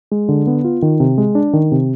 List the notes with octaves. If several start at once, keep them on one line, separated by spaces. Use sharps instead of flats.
G#3
D3
B3
F4
D#3
C3
G#3
D4
D#3
C3